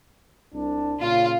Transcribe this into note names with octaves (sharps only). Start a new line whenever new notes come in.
C2 D4
A#2 C#3 F4